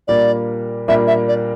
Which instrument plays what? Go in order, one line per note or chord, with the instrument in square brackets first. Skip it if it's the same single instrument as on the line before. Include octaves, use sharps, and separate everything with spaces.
[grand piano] A#2 G3 A#3 D4 [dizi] D5
[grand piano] A#2 G3 A#3 D4 [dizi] E5
[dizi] E5
D5